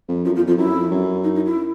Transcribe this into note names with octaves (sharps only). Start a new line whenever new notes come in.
F2
F#2 F4
E2 F4
F2 F4
F#2 E4
F2
F#2
D#4
D#4
E4